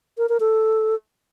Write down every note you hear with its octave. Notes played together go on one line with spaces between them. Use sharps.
A#4
A#4
A4